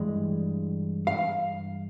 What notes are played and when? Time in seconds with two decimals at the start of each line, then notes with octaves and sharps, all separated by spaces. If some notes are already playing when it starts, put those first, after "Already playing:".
Already playing: G2 E3 G#3
1.07 F5